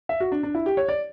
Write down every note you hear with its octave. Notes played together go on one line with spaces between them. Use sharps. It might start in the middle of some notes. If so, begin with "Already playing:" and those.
E5
F#4
D4
D4
E4
G4
C#5
D5